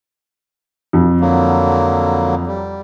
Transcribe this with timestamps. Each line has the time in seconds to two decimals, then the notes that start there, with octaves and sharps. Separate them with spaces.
0.93 F2
1.21 D3 F#3 A#3
2.47 G3